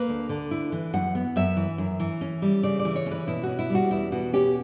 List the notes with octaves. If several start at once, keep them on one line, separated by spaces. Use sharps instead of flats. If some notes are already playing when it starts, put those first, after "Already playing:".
Already playing: A#3 B4
D2
D3
E4
E3
F#2 F#5
B3
F#2 E5
E3
F#2
E3
C#4
G3
C#3 D5
D5
E3
C#5
C#4
B4
B2 E4
C#4 F#4
E4
G3
F#4
E2 E4
B2 F#4
C#4 G4